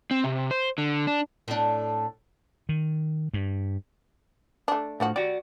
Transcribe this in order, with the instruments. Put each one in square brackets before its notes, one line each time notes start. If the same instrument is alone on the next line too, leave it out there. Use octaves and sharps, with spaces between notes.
[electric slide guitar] C4
C3
C5
D3
D4
[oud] A2 D4
[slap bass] D#3
G2
[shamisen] A3 D4
[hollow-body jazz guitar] A2 [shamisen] D3 F3 F#4
[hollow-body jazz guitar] F#4 D5 [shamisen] G4